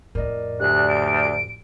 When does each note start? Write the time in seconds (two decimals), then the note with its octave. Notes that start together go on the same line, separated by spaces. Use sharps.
0.15 F2 A2 A#4 D5 D#5
0.60 D2 G4 D5 G#5 F#6
0.89 D7